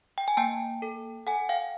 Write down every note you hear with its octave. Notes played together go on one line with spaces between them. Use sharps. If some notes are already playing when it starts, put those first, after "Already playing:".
G5
G#5
A#3 G5 A5
A4
A4 F#5 G#5
F5 G5